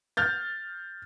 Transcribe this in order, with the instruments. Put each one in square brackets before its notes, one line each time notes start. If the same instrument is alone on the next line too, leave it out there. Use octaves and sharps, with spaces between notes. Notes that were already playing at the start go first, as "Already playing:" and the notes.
[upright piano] F6 G6 A6